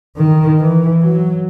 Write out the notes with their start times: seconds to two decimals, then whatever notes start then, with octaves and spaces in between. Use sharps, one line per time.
0.17 D#3
0.60 E3
1.02 F#3